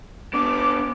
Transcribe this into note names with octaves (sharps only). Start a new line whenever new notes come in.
B3 D4 D6